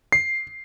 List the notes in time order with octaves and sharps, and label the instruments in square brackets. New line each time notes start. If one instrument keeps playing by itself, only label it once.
[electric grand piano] C7